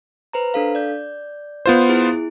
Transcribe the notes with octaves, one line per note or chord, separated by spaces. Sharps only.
B4 C5 A#5
D4 A4 F5
D5 G6
B3 F4 C5
E4 G#4